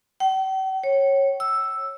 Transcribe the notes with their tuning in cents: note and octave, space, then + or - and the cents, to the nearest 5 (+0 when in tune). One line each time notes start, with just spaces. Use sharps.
G5 -45
C#5 -15
E6 +0